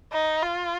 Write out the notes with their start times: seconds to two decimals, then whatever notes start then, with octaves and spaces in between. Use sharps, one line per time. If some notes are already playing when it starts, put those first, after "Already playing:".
0.13 D#4
0.42 F4